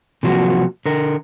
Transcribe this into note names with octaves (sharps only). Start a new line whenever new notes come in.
C3 F3 F#3 G#3 A#3 F#4
D3 A#4